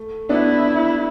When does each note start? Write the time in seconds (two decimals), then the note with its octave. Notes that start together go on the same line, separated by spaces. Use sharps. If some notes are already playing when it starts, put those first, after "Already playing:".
Already playing: A3
0.29 B3 D4 E4